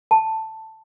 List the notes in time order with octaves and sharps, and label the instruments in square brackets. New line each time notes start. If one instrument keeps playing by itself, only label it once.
[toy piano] A5